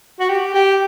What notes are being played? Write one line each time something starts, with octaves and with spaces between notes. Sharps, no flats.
F#4
G4
G4